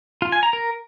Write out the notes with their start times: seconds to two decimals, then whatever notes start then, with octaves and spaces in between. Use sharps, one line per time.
0.22 F4
0.32 G#5
0.43 A#5
0.53 A#4